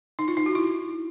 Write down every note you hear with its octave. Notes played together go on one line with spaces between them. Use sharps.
D#4
F4
D#4
F#4
E4